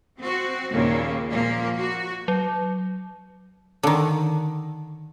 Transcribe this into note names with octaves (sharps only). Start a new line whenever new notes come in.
C4 F#4
D#2 A#2 C#3 A#3
A#2 F3 A#3
F#4
F#3
D3 D#3